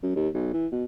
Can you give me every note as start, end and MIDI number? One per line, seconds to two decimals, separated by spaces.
0.03 0.15 42
0.16 0.28 39
0.34 0.51 35
0.53 0.67 52
0.72 0.85 47